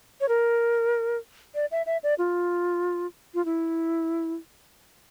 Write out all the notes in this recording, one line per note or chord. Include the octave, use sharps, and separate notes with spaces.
C#5
A#4
D5
E5
E5
D5
F4
F4
E4